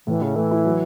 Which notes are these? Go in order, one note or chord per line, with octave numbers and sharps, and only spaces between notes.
A2 E3
C#3 E4
E3 A3
E4
F#3